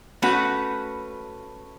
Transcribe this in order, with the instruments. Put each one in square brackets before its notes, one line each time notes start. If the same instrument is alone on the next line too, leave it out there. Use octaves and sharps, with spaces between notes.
[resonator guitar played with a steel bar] A3 C#4 F#4 B4 [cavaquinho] B5